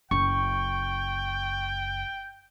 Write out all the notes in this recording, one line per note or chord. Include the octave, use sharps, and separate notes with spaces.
F#1 G5 C#6